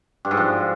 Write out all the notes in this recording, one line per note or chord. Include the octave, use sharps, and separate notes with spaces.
G2
G#2
F3